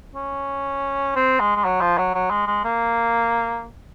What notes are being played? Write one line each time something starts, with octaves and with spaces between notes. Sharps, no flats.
C#4
C4
G#3
G#3
F#3
F3
F#3
F#3
G#3
G#3
A#3